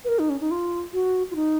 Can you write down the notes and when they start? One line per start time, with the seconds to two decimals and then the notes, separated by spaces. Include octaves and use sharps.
0.04 B4
0.08 A#4
0.19 D#4
0.30 C#4
0.41 D#4
0.51 F4
0.93 F#4
1.31 F4
1.36 D#4